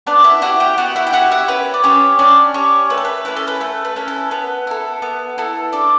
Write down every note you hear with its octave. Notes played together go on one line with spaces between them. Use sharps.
B3 D4 D5
E4 E5
E4 F#4 G4 F#5
G4 G5
B3 F#4 F#5
E4 E5
G5
E4 F#4 G4 F#5
E4 E5
C#4 B4
D5
C#4 G4 C#5
C#4 D4 D5
C#4 G4 C#5
A3 B4
A4
B4
C#4 E4 B4
A4
B4
A3 A4
B4
C#4 E4
A4
B3 B4
E4 A4
B3
E4 A4
D4 A4